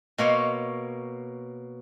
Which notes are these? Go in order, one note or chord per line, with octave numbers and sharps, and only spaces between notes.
B2 A#3 C#5 C6